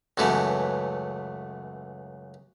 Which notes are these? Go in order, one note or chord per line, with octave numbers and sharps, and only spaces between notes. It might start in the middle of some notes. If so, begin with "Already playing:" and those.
C#2 F#2 E3 A3 B3